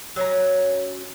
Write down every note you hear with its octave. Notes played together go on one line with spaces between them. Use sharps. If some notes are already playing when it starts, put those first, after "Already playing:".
F#3 C#4 A#5